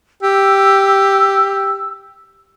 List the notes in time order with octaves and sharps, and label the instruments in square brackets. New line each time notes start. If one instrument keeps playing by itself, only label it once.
[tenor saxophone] G4 [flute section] E6